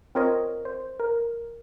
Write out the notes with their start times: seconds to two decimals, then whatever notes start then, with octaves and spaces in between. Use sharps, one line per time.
0.15 C4 F4 A#4 C#5 D#5
0.65 C5
1.00 A#4